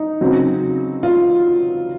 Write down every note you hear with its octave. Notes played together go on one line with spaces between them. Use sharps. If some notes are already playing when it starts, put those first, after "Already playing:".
Already playing: D#4
C#3 F#3 C4
F4